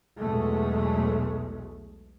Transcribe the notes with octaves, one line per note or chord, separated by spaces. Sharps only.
B1 E2 B2 G#3 A3